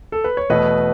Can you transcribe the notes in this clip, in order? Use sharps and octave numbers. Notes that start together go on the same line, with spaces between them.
A4
B4
C#5
E2 B2 A3 B4 D#5